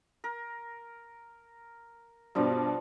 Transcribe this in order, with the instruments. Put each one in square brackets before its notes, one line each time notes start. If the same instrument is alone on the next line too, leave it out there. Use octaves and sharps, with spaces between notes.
[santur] A#4
[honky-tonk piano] G2 B2 [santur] F3 G3